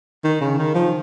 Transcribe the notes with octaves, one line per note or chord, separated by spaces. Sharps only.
D#3
C#3
D#3
F3